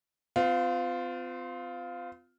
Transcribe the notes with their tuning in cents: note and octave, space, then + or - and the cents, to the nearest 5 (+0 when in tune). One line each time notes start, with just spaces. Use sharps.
C4 -40 F4 +5